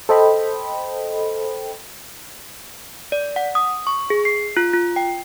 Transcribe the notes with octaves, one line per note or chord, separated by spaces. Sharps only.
A4 C5 D#5 G5 B5
D5
F#5
D#6
C#6
G#4
C7
F4
F4
G5